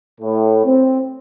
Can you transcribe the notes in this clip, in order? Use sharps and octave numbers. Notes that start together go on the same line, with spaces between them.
A2
C4